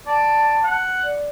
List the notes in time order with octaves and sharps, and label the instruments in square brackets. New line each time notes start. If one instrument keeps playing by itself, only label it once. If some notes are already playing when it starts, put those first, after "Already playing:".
[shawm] D5 [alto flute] A5
[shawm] F#5
[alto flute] D5